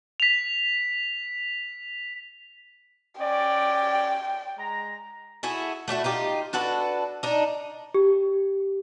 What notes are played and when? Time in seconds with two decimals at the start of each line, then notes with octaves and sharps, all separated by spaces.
0.20 B6 F7
3.20 C#4 D5 G5
4.58 G#3 A#5
5.43 E4 F#4 G#4 A4
5.88 A3 D4 E4 F#4
6.04 D#4 F4 G4
6.53 D4 F#4 A4 B4
7.23 D4 D#4
7.94 G4